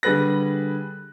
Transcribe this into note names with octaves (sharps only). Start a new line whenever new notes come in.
D3 G3 G#4 B4 F#6 A#6